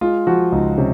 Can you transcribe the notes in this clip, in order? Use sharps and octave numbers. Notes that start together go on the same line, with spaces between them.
G#3 F4
F3 F#4
C#2 D#4
C3 C#4